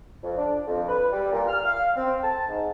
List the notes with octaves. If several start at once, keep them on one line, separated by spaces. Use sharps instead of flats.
F2
D4
F2
B4
G3
A#2
F6
F5
C4
A5
G#2